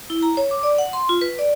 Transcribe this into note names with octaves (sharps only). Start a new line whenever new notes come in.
E4
A#5
C#5
D6
D5
F#5
C6
F4
B4
D5